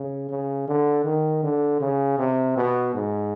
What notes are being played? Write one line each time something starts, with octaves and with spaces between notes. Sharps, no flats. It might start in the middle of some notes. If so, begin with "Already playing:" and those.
Already playing: C#3
C#3
D3
D#3
D3
C#3
C3
B2
G#2